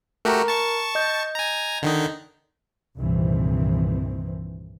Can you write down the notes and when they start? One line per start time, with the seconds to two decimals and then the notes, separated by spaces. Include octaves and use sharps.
0.25 A3 F#4 G4 A#4 A#5
0.48 A5 C#6
0.95 D#5 G6
1.35 G#5 A#5
1.82 D3 D#3 D#4
2.97 C2 G2 A#2 D#3 E3 C4